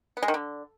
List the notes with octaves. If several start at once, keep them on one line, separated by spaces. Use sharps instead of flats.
B3
G#3
D#3
D3